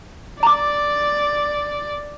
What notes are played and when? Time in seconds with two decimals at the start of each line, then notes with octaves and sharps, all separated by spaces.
0.43 D5 A#5 D6